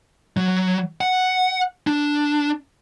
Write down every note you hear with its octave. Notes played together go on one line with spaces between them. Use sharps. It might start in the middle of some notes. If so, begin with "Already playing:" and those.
F#3
F#5
D4